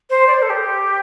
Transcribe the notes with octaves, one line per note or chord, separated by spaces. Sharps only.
C5
D5
C5
A4
G4